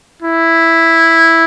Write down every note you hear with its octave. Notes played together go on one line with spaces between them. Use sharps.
E4